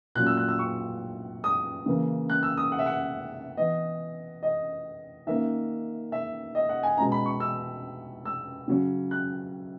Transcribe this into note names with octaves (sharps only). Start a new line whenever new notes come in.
A#2 F#3 C#4 F#6
E6
F#6
E6
C#6
D#6
C#3 E3 A#3
F#6
E6
D#6
F#5
E5
F#5
E3 B3 D#5
D#5
D#3 A#3 C#4 E5
E5
D#5
F#5
G#5
B2 G#3 C#4 A#5
B5
C#6
E6
E6
C#3 F#3 C#4
F#6